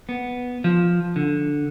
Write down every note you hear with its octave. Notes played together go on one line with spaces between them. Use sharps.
B3
F3
D3